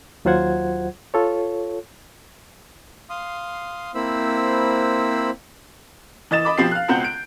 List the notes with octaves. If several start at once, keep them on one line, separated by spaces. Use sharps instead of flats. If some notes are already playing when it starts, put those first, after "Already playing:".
D#2 F#3 F4 C5 F#5 G#6
F4 A4 C#5
F5 C6 D#6
A#3 C4 E4 C5 B5 E6
E3 D#5 A6 E7
D#5 B5 D6
B2 F3 C4 G4 C7
F5 F#6
C#2 B2 C4 F#5 G6
D7